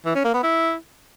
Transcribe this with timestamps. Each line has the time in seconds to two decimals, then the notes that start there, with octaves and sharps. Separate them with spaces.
0.06 E3
0.15 C#4
0.25 A#3
0.34 B3
0.43 E4